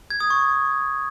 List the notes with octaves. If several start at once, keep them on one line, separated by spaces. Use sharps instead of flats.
G#6
D#6
C#6